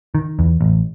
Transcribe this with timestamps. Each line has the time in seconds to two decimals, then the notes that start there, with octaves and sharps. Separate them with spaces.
0.15 D#3
0.39 E2
0.61 A1